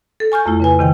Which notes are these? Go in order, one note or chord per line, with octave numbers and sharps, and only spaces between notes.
A4
G#5 C#6 F6 G6
F2 A3 E4
C#3 B4 G#5
C3 D#3 G5